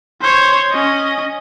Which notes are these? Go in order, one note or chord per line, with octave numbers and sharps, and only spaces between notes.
C5 C#5
C#4 D#5